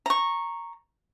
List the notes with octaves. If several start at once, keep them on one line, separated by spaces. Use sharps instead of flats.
A#5 C#6